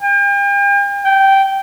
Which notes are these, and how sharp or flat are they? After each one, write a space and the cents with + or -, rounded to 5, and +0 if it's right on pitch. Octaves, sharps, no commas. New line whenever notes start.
G5 +40
G5 -10